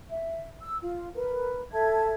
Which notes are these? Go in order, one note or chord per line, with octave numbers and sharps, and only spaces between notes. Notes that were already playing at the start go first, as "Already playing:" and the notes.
E5
E6
F4
A#4 B4
A4 E5 A5 G#6